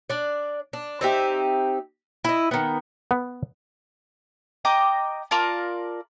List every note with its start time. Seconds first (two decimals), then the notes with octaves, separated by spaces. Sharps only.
0.10 D4 D5
0.73 D4
1.01 C4 D#4 G4 E5
2.24 E4 D#5
2.51 D#3 B3
3.11 B3
4.65 D#5 G5 A#5 D6
5.31 F4 A#4 D5 A5